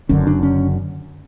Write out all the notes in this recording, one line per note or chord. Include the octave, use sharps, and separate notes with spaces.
F#1 F#2 D3 C#4
D4
C#4